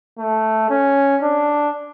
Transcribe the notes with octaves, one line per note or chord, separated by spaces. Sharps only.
A3
C#4
D4